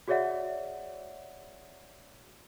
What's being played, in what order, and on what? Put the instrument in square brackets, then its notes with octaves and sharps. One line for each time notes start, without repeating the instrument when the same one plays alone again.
[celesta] F#4 G#4 C#5 D5 E5 F#5